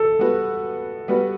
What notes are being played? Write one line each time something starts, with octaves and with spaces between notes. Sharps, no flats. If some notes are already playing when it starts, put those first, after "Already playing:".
Already playing: A4
G3 B3 F#4 B4
G3 B3 F#4 B4